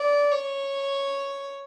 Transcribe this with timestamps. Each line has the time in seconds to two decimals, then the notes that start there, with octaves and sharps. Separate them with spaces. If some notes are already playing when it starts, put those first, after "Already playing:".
Already playing: D5
0.32 C#5